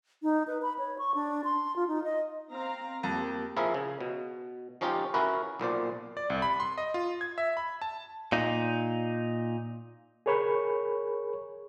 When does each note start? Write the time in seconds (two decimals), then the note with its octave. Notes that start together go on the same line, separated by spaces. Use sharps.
0.23 D#4
0.48 B4
0.62 B5
0.79 C#5
0.99 C#6
1.15 D4
1.44 C6
1.76 F4
1.88 D#4
2.04 D#5
2.51 C4 F5 A#5
3.03 F2 A#3 G4
3.57 F3 E4 G#4 A#4 E5
3.74 C#3
4.01 B2
4.81 F3 C#4 D#4 F4 G4
5.14 C#4 E4 F#4 A#4 B4
5.60 B1 A#2 C5 D5
6.17 D5
6.30 C2
6.42 B5
6.60 C6
6.78 D#5
6.94 F4
7.21 G#6
7.38 E5
7.57 B5
7.82 A5
8.32 A#2 D#4
10.26 G#4 A#4 C#5 B5 C#6